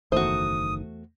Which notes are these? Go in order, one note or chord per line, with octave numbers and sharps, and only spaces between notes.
F#1 E2 D#3 A3 F#4 C5 D#6